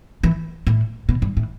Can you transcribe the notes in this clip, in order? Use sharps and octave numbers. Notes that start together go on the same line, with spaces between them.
E3
A2
B2
G2
A2